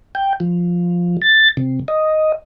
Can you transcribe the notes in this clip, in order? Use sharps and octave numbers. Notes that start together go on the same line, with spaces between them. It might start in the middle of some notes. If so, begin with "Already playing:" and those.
G5
F3
A6
C3
D#5